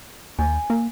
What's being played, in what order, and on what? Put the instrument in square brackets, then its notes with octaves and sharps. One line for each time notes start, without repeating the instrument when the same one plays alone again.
[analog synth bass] D#2 [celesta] G#5
[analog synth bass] A#3